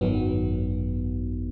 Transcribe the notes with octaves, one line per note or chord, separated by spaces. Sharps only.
G#1 F#2 D#3 F#3 B3